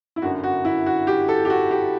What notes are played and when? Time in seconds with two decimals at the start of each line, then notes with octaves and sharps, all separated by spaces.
0.16 E4
0.22 G1 F#2 D3 F#4
0.44 F#4
0.65 E4
0.86 F#4
1.07 G4
1.28 A4
1.45 G4
1.50 F#4
1.71 G4